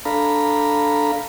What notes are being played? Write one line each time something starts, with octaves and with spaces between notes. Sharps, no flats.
D4 A4 F5 A#5 B5